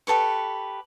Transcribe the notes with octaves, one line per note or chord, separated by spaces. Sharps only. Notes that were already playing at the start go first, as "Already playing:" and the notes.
G4 A4 B4 C#6